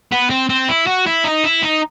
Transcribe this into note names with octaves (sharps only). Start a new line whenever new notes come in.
B3
C4
C4
E4
F#4
E4
D#4
E4
D#4